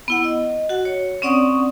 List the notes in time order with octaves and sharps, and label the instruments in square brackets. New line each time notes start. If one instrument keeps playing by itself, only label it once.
[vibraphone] B3 E4 F#5
D#5
F#4 F#5
C#5
C4 C#4 D5 F#5 C#6 D#6